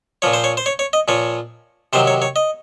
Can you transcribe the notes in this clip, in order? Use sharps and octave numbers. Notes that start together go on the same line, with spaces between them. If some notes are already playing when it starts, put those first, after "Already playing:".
A#2 F3 C#5
C5
C#5
C5
C#5
C#5
D#5
A#2 F3 C#5
C3 D#3 F#3 C5
C#5
C#5
D#5